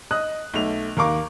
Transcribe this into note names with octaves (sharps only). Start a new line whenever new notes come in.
D#5 D#6 F#6
B1 A3 F7
D#2 A#4 F5 C#6 D6